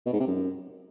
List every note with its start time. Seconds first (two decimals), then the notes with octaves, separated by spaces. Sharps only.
0.06 B2
0.13 G#2
0.20 C3
0.28 F#2